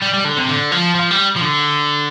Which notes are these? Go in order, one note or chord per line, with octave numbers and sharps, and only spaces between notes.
G3
G3
D3
C3
D3
F3
F3
G3
F3
D3